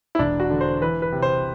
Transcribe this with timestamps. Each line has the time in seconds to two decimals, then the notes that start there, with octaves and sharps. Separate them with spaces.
0.15 E4
0.19 E1 D4
0.40 F#4
0.50 D3
0.61 C5
0.81 E3 B4
1.02 B4
1.12 C3
1.22 C5